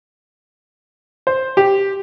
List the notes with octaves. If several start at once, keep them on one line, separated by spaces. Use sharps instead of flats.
C5
G4